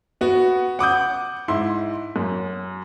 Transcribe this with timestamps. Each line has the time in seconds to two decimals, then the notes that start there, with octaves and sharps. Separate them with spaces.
0.21 B3 F#4
0.79 F#5 D6 D#6 G6
1.48 G#2 E4 C6
2.16 F#2